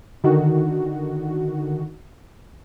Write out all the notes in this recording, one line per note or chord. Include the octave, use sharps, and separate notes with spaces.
D3 D#3 F#4